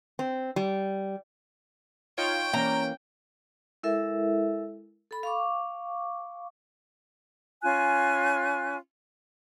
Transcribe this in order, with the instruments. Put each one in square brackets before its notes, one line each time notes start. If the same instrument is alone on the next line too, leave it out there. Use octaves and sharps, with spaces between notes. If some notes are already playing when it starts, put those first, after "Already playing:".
[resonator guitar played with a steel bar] C4
G3
[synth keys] D#4 F4 C#5 [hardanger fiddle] G5
[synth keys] E3 A#3 [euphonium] C#4 [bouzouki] A#5
[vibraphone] G#3 E4 A4 A#4 E5
A4 B5
F5 C#6 D6
[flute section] C#4 F4 G#5 F#6